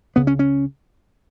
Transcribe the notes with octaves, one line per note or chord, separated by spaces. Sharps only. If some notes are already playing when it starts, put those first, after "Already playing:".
C#2 C#3 B3
C#4
C#4